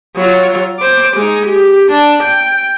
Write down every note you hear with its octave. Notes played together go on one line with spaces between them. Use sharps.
F#3 F4
C5 D6
G#3 D#4
G4
D4
G5